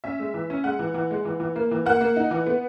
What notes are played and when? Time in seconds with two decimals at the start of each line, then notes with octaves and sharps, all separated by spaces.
0.04 C#4 E5
0.20 G#3
0.34 E3
0.50 C#4
0.64 G#3 F#5
0.79 E3
0.94 E3
1.11 G#3
1.25 E3
1.40 E3
1.56 A#3
1.71 E3
1.86 A#3 F#5
2.01 A#3
2.16 D#4
2.31 E3
2.47 B3